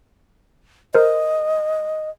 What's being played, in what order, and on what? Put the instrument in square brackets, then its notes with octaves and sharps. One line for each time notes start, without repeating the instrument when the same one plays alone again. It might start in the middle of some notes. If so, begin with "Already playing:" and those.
[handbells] A#4 C5 [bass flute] D#5